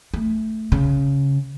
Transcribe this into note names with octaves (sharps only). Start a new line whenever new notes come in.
A3
C#3